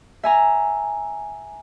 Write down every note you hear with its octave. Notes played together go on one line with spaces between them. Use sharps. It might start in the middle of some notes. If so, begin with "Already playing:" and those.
E5 G#5 A#5